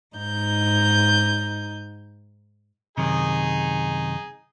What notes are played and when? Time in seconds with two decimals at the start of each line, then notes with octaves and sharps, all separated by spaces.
0.16 G#2 D#4 G6
2.98 F#2 C3 D#3 D#4 G#4